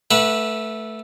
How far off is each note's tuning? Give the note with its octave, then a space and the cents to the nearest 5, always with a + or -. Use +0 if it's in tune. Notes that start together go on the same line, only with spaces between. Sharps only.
A3 +0 B4 -20 F#5 -25